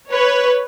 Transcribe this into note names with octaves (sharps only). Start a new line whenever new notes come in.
B4 C#5